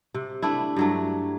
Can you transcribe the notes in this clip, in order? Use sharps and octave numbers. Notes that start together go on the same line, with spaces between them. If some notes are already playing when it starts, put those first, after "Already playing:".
C3
A3 D4 E4
G2 F#3 A3